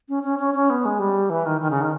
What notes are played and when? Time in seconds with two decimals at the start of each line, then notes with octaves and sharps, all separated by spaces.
0.09 C#4
0.23 C#4
0.39 C#4
0.54 C#4
0.70 B3
0.85 G#3
0.99 G3
1.30 E3
1.46 D#3
1.61 D#3
1.71 C#3
1.81 D#3